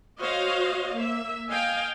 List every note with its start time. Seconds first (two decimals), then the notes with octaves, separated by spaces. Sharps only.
0.21 F#4 C5 C#5 D#5 F5
0.96 A#3 E5
1.49 D#5 F5 G5 G#5